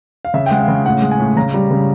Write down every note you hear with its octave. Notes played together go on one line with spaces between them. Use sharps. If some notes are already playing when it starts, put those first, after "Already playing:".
F5
C#3 E5
G5
G#3 F#5
F5
C#3
A2 F#5
G#3
G#5
A2
C#3 A#5
G3
C#3